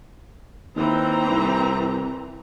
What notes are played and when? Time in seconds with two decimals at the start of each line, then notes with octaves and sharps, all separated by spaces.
0.76 D#2 E3 C4 A#5
1.30 C2